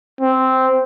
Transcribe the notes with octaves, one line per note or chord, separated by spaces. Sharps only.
C4